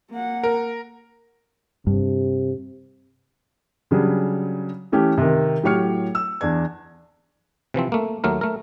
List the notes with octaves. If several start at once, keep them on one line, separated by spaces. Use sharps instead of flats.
A#3 F#5
A#4
G2 C3
C#3 F#3 G3 D4 G#4
E3 A3 C#4 G4
C3 D#3
A2 F#3 G4 C#5 F6 C#7
E6
E2 D4 G#6
C3 E3 F3 C4
A3 A#3
D#2 F#3 A3 A#4
A3 A#4